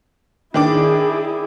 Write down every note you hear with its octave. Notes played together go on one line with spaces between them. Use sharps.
D#3 D4 E4 G#4 D6